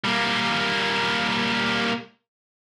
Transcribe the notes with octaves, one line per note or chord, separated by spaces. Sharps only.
G3 A#3